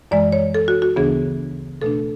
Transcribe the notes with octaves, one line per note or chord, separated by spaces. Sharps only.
F#2 E3 G#3 D5
C#5
A4
F#4
F#4
D2 C#3 E3 B3 D4 G#4
B2 A3 D4 A4